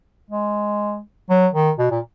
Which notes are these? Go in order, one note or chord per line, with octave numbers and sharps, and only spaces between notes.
G#3
F#3
D#3
B2
A#2